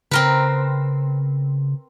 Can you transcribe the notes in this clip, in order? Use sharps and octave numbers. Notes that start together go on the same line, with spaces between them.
C#3 C4 A#4 B4